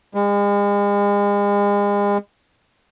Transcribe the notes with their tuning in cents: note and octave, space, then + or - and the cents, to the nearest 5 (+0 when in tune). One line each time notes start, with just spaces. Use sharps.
G#3 -40